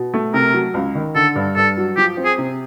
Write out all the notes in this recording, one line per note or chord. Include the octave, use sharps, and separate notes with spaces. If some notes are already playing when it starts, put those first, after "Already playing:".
Already playing: B2
A3
C3 A#4
F#3
C#2
D#3
D3 A4
G2
G2 A4
F#3
F3 G4
C4
G#4
C3